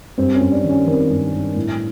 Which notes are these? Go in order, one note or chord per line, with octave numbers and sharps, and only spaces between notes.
G2 C4
C#4
G2
D4
D#3
C#4
D#3 C4
G2
G2
A2